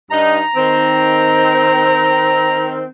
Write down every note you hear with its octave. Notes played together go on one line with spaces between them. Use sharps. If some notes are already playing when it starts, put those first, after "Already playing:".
G2 D#4 A#5
D#3 C4